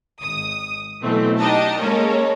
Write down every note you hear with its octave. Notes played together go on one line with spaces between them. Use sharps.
G#1 D#6
B2 E3 F#3 A3 C4
D4 D#4 G4 D#5 A5
G#3 A#3 C#4 A4 A#4 C#5